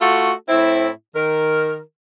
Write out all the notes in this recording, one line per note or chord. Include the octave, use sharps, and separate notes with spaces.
A3 F4 F#4 A4
A2 C4 E4
D#3 A#4